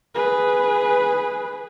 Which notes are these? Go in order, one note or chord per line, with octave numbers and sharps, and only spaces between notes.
G#4 B4